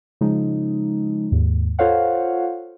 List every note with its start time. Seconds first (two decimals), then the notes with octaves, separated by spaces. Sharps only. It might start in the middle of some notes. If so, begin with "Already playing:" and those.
0.21 C#3 F3 G#3 D#4
1.32 D#2 G#2
1.79 F4 A4 C5 C#5 F5 F#5